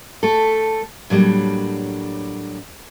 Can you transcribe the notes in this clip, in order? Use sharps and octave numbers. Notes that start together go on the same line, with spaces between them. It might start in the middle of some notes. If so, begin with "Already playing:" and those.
A3 A4
A2 F#3 G3 A#3 D4